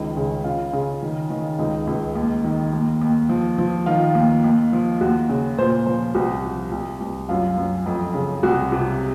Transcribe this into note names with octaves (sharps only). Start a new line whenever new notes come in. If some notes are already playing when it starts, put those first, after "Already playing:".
Already playing: C#2 D#3
C#3
C#3 F4
C#3
D#3
D#3
C#2 D#4
C#2
D#2
D#3
D#2
D#2
F3
F3
D#3 F4
D#2
D#2
F3
D#2 F#4
C#3
A#2 C5
F3 C5
C2 F#4
F3
C2
C2
F#2 F4
F#2
F2
C#3
C2 F#4
C3